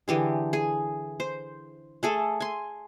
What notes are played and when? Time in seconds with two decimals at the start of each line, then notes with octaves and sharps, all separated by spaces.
0.08 D3 E3 G4 G#4
0.53 G#4
1.20 C5
2.03 A3 G#4 A4
2.40 G#5 C6